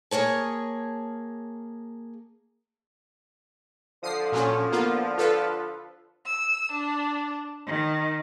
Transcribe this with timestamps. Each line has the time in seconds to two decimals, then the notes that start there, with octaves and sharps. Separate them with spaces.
0.11 A#3 G#4 C#5 A5
4.03 D3 F3 D#6 C7
4.32 A#2 F#3 C#4
4.72 A#3 B3 F4
5.18 F4 A4 B4
6.27 E6
6.73 D4
7.67 D#3